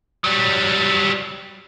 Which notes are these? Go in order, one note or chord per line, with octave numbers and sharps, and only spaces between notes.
F#3 G3